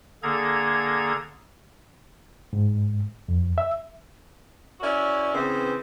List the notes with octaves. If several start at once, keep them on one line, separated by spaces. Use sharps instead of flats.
D3 A#3 G#4 A4 A#5 G#6
G#2
F2
E5
C#4 E4 F#4 A#4 D5
C#3 E3 B3 C4